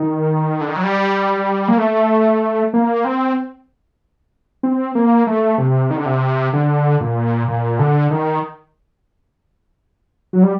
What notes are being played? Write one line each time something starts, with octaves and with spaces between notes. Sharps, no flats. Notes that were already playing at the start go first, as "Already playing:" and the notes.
Already playing: D#3
D3
D#3
F#3
G3
A#3
A3
A#3
C4
C4
A#3
A3
C3
D#3
D3
C3
D3
A#2
A#2
D3
D#3
F#3
G3